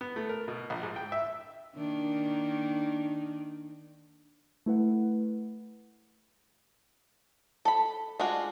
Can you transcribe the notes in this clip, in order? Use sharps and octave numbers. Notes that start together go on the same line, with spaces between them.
B3
A3
A#4
B2
A#1
G#2
G5
E5
D#3 A#3 D4
A3 E4 B4 F#5
A4 B5
G#3 D4 F4 F#4